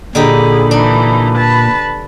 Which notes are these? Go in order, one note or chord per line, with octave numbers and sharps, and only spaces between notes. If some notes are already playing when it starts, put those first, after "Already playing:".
A#2 D3 D#4 G4 G#4 B5
E3 D4 D#4
B4 A5